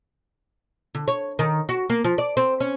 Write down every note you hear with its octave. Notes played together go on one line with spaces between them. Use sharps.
D3
C#5
D#3
F#4
A#3
F3
D5
C4
C#4